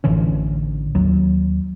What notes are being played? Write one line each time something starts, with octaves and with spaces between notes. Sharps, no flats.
A1 D3 E3 C#4
D#2 F#3